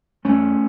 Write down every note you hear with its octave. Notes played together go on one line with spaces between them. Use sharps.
E2 A3 C#4